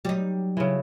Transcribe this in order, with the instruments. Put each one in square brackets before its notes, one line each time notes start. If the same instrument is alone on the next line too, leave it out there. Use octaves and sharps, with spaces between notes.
[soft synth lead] F#3 [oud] G3 D#4
[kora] C#3 E3